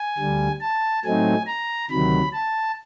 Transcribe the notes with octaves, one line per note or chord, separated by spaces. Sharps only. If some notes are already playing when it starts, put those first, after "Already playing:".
Already playing: G#5
D2 D3 G3
A5
A2 F#3 A3 C4 D#4 G#5
A#5
D2 C3 D#3 F#3 B5
A5